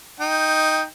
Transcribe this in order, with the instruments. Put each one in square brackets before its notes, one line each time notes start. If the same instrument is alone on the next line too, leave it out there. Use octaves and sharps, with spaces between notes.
[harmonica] D#4 G5